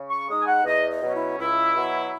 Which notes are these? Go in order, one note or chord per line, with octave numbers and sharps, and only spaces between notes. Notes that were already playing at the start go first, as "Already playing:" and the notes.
Already playing: C#3
C#6
G#3 D#4 D#6
G#5
F#5
E2 D#5
D#5
B2 F#3 C#4
E4
C#2 E4
B2 F#3